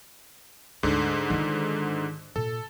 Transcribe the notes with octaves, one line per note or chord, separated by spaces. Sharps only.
D2 G#2 D3
D#3 F4
A#2 A4